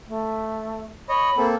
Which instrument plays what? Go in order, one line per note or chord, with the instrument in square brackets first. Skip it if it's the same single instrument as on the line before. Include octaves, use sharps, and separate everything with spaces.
[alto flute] A3
[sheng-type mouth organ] C#5 D#5 [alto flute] B5
[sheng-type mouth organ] A#3 C4 A4